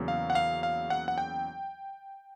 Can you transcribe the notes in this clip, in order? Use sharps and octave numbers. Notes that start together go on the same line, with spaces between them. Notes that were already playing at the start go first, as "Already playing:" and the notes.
Already playing: E2 C#3 F#3 A#3
F5
F#5
F5
F5
F#5
F#5
G5